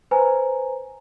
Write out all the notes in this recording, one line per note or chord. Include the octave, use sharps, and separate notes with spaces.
B4 C5 G#5 A#5